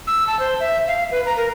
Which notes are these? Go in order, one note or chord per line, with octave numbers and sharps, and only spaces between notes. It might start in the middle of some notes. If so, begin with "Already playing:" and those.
E6
A5
C5
E5
F5
B4
A#5
A#4